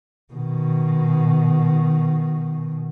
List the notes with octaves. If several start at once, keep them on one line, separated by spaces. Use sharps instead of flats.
B2 D#3